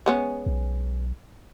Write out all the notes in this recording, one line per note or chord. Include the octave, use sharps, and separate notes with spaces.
G#3 B3 C#4
B1